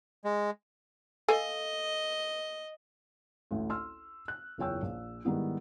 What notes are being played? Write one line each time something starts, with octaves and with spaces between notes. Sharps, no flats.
G#3
A4 D#5 F5 G#5
A1 D2
C6 E6 F6
F#6
F#1 E2 F4 C#5 G5 E6
A#1
G#2 D#3 G3 B3 E4